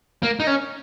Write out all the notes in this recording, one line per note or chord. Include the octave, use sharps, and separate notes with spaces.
A#3
D#4
C#4